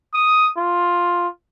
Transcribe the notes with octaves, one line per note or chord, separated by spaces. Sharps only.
D#6
F4